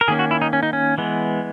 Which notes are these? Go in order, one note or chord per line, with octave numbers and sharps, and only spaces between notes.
A#4
D#3 A#3 C#4 G#4
F#4
E4
D#4
C#4
D#4
C#4
E3 G#3 B3